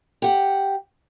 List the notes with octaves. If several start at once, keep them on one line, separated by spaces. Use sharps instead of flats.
G4 F#5